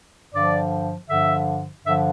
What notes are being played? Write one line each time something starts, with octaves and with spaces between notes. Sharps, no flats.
G2 D3 F3 D5
G2 D3 F3 E5
G2 D3 F3 E5